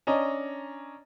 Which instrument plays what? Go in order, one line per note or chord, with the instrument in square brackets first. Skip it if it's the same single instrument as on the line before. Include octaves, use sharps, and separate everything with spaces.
[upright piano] C#4 D4 D#5 A#5